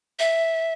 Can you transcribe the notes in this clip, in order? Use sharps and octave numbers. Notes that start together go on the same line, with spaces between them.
E5